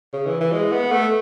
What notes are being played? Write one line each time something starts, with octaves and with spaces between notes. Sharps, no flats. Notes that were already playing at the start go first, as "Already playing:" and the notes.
C#3
E3
E3
G#3
B3
A3